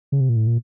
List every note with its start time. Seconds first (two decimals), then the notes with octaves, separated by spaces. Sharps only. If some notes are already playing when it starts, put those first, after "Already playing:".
0.12 C#3
0.20 C3
0.29 A#2
0.36 A2
0.47 A#2